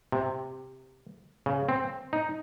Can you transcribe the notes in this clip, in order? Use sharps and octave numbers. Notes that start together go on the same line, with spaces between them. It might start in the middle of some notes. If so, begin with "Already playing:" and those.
C3
C#3
C4
D#4